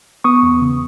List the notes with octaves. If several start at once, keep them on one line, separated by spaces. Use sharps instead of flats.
B3 C#6 D#6
E2
C#3